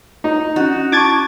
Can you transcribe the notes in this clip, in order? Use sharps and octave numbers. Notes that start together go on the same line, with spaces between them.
D#4
C#4 F#4 D#5
E4 A5 C#6 D6 G#6 A6